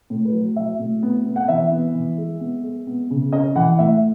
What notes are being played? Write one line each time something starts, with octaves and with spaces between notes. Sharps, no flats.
A2
B4
F#3
F#3 E5
A2
B3
B3
F#5
E3 E5
B3
E3
G#3
B3
G#3
B3
C#3
C#4 D#5
E3 F#5
A2 E5